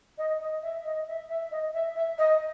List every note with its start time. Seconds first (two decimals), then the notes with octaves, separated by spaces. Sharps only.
0.18 D#5
0.40 D#5
0.62 E5
0.85 D#5
1.07 E5
1.29 E5
1.51 D#5
1.73 E5
1.95 E5
2.18 D#5